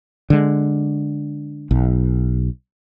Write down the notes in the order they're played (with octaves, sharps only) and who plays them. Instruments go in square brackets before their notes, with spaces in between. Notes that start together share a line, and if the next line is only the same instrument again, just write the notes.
[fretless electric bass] D3 G#3
B1